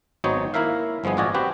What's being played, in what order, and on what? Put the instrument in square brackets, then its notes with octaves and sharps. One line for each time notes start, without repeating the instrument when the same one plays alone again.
[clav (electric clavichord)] G#1 F#3 B3 D#4 C5 C#5
A#3 E4 A#4 E5 F5
G1 F3 G#3 B3 G#4
A1 F4 F#4 D5 D#5 G#5
C4 F#4 G4 B4